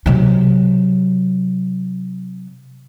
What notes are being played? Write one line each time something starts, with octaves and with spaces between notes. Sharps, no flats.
C3 F#3